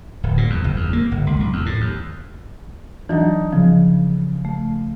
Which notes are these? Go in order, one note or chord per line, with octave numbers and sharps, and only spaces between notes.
D1
A#2
E2
F#1
E2
A#3
G1
C#2
B1
E2
A2
D#2
E3 F#3 D4 D#4
C#3 F3
A3